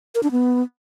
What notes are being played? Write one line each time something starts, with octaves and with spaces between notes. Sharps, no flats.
A#4
D4
B3